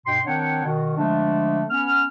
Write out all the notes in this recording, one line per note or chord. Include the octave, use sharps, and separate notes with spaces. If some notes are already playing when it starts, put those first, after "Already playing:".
G2 B2 G5 C6
D#3 C4 D4 C#5 F#5 G5
B2 D#3
D3 F3 G#3 A3 D4
B3 C#4 F6